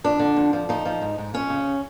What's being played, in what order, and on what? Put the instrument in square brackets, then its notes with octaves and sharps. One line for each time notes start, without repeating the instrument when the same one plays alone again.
[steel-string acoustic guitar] F2 D4
D3
F2
F3
F3 D#4
F3
G#2
G#2
F2 C#4
C#3